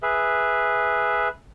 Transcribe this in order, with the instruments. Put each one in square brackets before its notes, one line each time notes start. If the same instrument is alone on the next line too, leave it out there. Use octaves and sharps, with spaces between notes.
[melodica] G#4 B4 E5